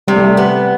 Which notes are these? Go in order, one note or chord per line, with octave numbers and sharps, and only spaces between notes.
C3 G3
A3
G3
B3